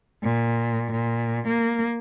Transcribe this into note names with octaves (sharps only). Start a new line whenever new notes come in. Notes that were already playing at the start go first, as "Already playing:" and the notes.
A#2
A#2
A#3